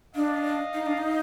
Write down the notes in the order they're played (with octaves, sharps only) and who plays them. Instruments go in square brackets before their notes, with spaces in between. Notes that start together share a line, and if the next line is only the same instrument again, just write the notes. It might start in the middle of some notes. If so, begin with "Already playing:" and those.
[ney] D4 [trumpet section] D#5 F5
[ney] D#4
D4
D#4